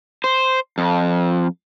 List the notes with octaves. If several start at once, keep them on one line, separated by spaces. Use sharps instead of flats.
C5
F2